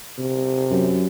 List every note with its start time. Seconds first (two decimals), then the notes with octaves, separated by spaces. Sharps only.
0.18 C3
0.71 F#2